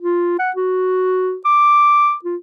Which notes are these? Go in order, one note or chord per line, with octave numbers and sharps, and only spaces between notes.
F4
F#5
F#4
D6
F4